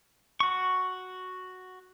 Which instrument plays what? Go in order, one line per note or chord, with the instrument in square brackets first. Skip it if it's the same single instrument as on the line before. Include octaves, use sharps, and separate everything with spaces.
[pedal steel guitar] F#4 C#6